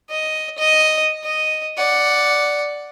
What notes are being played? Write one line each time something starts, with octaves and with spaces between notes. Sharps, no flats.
D#5
D#5
D#5
D5 F#5